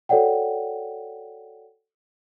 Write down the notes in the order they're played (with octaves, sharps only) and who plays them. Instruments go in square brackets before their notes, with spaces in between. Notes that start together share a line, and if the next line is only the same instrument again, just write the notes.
[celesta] F#4 A4 C#5 D5 F#5 G5